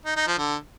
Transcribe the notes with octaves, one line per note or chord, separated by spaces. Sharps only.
D#4
D#4
F3
D3